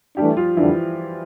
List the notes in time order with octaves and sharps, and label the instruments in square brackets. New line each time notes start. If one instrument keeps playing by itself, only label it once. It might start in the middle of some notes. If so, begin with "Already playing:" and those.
[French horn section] E3 A3 D4 [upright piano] G3 G4
[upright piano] F3 F4
[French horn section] F2 D3 G3 D4 [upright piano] E3 E4